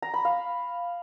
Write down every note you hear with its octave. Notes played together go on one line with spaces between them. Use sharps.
A#5
B5
F5